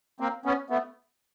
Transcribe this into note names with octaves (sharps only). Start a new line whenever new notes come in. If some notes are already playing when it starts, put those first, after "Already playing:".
A#3 C4
B3 C#4
A3 B3